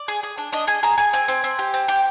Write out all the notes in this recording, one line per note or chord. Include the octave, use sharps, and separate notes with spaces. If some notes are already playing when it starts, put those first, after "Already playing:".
Already playing: D5
G#4
G#4
D4
D4 D#5
G#4 G#5
G#4 A#5
G#4 G#5
C4 G#5
C4
C4
G4
C4
G4